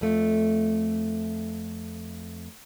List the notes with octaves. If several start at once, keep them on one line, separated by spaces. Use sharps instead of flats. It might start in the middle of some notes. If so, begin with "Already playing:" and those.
F2 A3